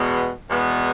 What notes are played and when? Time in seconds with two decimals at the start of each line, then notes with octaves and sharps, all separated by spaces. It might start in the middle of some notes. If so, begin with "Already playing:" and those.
Already playing: E2 B2 G#3 B3
0.50 E2 B2 G#3 B3